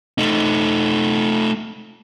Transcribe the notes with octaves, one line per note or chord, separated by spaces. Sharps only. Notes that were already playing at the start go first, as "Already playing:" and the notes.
A3 D#4